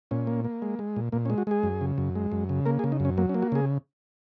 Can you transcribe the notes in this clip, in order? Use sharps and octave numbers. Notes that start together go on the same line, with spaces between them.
A#2 C#4
A#3
A#3
G#3
G#3
A#2
A#2 A#3
C#4
G#3
F#4
G#3 G#4
F#2
C#3
F#2
G#3
F#2
C#3
A#3 A#4
G#4
C#3
D#4
F#2
C#4
F#3 A#3
C#4
A#3
F#4
C#3 G#4